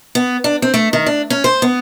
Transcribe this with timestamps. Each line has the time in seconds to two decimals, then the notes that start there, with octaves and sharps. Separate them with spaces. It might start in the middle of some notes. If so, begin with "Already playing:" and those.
0.15 B3
0.44 D4
0.62 C4
0.74 A3
0.93 D#3
1.06 D4
1.30 C#4
1.44 C5
1.62 B3